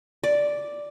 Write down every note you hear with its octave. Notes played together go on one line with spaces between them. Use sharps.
D5